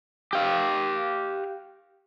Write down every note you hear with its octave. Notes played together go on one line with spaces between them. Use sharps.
G4 F5